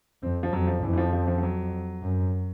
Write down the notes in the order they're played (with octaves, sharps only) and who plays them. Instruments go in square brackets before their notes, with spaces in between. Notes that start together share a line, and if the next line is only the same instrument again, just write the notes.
[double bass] F2 [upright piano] C4
[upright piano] F3
[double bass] F2 [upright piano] F#3
[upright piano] F3
[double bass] F2 [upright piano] E3
[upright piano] E3
F3
F3
F3
F3
F#3
[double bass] F#2